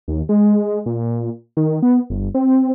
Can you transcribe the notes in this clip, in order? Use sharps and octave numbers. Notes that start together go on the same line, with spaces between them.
D#2
G#3
A#2
D#3
B3
G1
C4